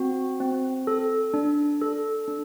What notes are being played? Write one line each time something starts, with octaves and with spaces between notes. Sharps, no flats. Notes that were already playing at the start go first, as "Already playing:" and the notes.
Already playing: C4 F#4
C4
A4
D4
A4
D4